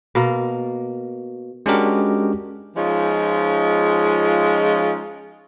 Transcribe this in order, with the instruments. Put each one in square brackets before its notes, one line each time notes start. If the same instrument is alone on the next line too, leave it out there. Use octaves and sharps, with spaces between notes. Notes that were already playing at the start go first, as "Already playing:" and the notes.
[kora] B2 A#3
[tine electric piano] G#3 C#4 D4 F#4 G4 A#4
[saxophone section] F3 G#3 C#4 D#4 F4